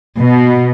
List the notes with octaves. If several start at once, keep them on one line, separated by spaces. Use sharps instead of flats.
B2